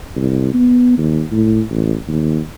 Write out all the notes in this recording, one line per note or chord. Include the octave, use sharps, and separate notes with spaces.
C2
B3
D#2
A2
A1
D#2